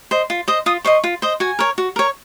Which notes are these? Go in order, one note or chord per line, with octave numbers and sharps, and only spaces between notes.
C5 D#5
F4
C5 D#5
F4 D#6
C5 D#5 C#6
F4
C5 D#5
F#4 G#5
A#4 C#5
F#4
A#4 C#5